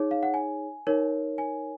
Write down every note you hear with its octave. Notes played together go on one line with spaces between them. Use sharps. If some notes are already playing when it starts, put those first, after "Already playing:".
Already playing: D#4 G#4 C#5
F5
F#5
G#5
D#4 A#4 C#5
G#5